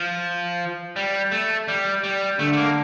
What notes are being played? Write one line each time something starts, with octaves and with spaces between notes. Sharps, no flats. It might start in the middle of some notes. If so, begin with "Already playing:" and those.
Already playing: F3
G3
A3
G3
G3
D3 A3
A3
A#3